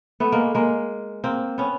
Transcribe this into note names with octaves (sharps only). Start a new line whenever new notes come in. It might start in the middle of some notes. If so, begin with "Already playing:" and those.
A3 B3
G#3 A#3
G#3 A#3
A#3 C4
B3 C#4